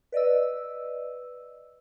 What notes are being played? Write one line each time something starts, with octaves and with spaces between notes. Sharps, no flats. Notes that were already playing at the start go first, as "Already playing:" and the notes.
B4 D5 D#5 E6